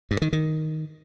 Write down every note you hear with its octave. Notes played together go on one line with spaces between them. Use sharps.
G2
D#3
D#3